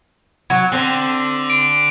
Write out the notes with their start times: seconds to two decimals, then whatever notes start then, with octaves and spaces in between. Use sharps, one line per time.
0.50 F#3
0.72 D3 C4
1.50 D7